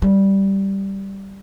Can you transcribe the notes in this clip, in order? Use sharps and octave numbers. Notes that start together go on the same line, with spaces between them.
G3